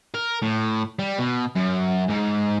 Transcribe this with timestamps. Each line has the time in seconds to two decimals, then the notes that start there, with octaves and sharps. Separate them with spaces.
0.14 A#4
0.42 A2
0.99 G3
1.18 B2
1.55 F#2
2.10 G#2